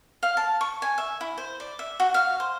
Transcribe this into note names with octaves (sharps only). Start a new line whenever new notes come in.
F5
A5
C#6
G#5
E5
E4
C5
D5
E5
F#4
F5
C5